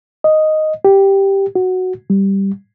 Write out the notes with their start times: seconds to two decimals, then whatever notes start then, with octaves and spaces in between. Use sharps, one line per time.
0.24 D#5
0.85 G4
1.55 F#4
2.10 G3